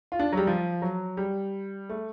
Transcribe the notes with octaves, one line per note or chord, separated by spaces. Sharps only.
F4
D4
F#3
G3
F3
F#3
G3
A3